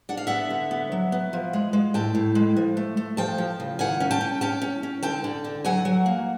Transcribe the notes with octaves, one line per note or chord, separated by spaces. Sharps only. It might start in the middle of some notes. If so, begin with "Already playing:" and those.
D4 F#5
F5
B3 E5 F#5
D3
B3
F#3
B3
F3
G#3
G#3
A2 G5 A5
A2
G#3
F3
A3
A3
F3 G5 A5
F3
C#3
D#3 F#5 G#5
C#4
G5 A5
C#4
C#4 G5 A5
C#4
C#4
D3 G5 A5
D3
D3
F#3 F#5 G#5
F#3
A#3